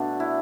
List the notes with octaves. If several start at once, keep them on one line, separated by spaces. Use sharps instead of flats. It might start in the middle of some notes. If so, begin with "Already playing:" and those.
Already playing: B2 A3 D4
E4